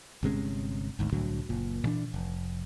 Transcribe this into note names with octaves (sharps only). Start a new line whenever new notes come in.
G1 C3 G#3 C#4
G#1 D2 G#2
C2 A2 D3 F#3
F#1 A#2
A#2 E3 D4
F1